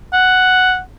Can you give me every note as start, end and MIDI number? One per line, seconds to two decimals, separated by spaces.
0.13 0.80 78